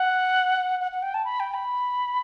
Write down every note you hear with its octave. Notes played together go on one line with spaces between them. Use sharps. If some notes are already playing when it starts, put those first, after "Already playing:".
Already playing: F#5
F#5
F#5
G5
A5
B5
G5
B5